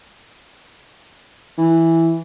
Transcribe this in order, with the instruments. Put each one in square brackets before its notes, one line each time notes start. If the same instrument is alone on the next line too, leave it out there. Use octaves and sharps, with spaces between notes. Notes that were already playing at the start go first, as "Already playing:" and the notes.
[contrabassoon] E3